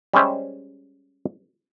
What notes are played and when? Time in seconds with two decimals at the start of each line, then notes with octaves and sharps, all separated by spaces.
0.13 G3 G#3 C#4 C5 E5